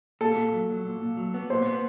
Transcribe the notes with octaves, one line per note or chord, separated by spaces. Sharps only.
A#2 A4
A#2
F#3
F#3
A#2
A#2
F#3
B3
A#2 C5
B3